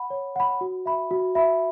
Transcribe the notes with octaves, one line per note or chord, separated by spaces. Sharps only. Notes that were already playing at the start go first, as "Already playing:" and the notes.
Already playing: F#5 B5
C#5
F#5 B5
F#4
E5 B5
F#4
E5 B5